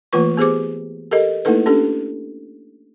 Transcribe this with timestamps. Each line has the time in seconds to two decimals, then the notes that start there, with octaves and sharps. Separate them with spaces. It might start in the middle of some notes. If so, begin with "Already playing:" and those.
0.13 E3 A3 A#3 F4 B4 C#6
0.37 B3 G4 G#4 C5 D6
1.11 G4 A4 A#4 D#5
1.45 A3 A#3 D#4 E4 A4 B4
1.66 C#4 D4 G4 A4